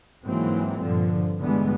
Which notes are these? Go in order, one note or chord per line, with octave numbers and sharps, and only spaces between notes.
G#2 E3 F#3 A#3 C4
G2 A#2 D3 F3
G2 D3 E3 G3 G#3 B3